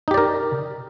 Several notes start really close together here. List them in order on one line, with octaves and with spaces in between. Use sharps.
D#4 G4 D5 A#4